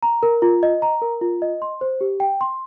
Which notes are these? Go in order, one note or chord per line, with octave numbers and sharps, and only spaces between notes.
A#5
A#4
F4
D#5
A#5
A#4
F4
D#5
C6
C5
G4
G5
C6